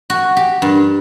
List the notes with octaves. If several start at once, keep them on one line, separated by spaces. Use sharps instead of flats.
F#4
G4
G2